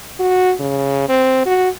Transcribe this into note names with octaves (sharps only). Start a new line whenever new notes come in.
F#4
C#3
C4
F#4